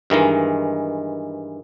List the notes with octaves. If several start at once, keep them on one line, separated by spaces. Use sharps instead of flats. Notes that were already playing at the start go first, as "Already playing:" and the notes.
G2 D#3 E3 G#3